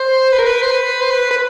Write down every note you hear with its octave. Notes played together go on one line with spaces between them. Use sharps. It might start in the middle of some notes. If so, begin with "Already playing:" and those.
Already playing: C5
B4
A#4
B4
C5
B4
C5
B4
B4